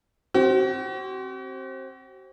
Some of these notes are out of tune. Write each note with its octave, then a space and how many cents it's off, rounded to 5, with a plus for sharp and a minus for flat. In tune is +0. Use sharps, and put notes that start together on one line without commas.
C4 +20 F#4 +45